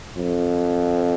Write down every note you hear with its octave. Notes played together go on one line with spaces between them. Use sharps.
F2